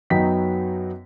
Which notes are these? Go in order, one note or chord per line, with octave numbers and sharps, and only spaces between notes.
F#2 F#3 B3 D#4 G5 B6